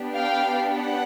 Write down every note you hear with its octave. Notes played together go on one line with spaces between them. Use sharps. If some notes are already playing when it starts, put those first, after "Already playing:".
Already playing: B3 D4 G4
F5 G5
F#5